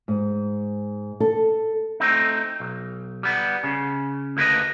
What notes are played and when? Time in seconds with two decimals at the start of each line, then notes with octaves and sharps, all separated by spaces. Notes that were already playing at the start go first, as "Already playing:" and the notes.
0.08 G#2
1.20 A4
2.00 A3 C4 D#4
2.60 B1
3.23 G3 B3
3.64 C#3
4.37 D2 A#3 E4 B4 D#5